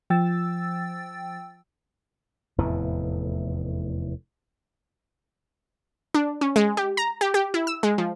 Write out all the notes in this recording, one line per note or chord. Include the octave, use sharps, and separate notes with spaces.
F3 G5 E6 A6
F1 E2 A2 E3
D4
C#4
G#3
G4
A#5
G4
G4
E4
E6
G#3
F3